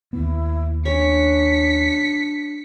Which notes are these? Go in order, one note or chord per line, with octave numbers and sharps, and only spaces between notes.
D#2 B3 E4
C#4 D4 C#5 B6 C#7